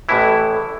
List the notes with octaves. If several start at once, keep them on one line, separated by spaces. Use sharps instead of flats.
A1 A2 E3 E4